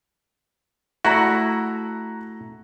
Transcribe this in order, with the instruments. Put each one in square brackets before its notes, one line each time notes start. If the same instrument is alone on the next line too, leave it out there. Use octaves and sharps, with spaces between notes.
[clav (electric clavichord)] A3 E4 F#4 [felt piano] A#5 F#6 A#6